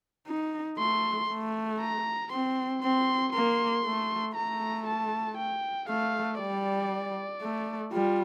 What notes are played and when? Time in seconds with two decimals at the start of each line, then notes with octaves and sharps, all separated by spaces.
0.28 D#4
0.78 A3 C6
1.30 A3
1.80 A#5
2.31 C4 C6
2.82 C4 C6
3.33 A#3 C6
3.85 A3
4.35 A3 A#5
4.87 A5
5.37 G5
5.89 A3 F5
6.40 G3 D5
7.41 A3
7.92 G3 F4